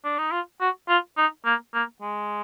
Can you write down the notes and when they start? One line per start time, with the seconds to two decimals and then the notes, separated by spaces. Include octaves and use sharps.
0.05 D4
0.18 D#4
0.31 F4
0.61 F#4
0.89 F4
1.17 D#4
1.46 A#3
1.74 A#3
2.02 G#3